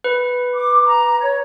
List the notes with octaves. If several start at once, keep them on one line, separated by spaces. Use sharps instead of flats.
B4
D6
A#5
C#5